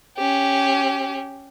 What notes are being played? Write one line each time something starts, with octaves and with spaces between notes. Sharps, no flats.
C#4 G4